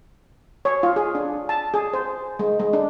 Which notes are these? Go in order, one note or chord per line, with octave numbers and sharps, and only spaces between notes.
C#5
F4
G#4
D4
A5
G#4
C5
G#3
G#3
D4